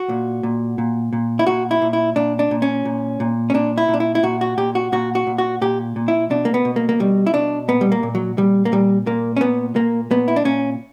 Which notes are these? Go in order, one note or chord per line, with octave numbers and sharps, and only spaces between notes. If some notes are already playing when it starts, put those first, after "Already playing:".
Already playing: F#4
A#2
A#2
A#2
A#2
E4
A#2 F#4
E4
A#2
E4
A#2 D4
D4
A#2
C#4
A#2
A#2
C#4
A#2 D4
E4
A#2
D4
E4
E4
A#2 F#4
F#4
A#2 G4
F#4
A#2 F#4
F#4
A#2
F#4
A#2 G4
A#2
E4
B2 D4
A#3
B3
B2
A#3
A#3
B2 G3
E4
B2 D4
A#2 B3
G3
A#3
A#2
F#3
A#2 G3
A#3
A#2 G3
A#2 A#3
C#4
A#2 B3
A#2 A#3
A#2 B3
E4
D4
A#2 C#4